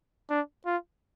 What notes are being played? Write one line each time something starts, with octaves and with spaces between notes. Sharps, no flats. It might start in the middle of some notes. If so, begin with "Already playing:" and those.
D4
F4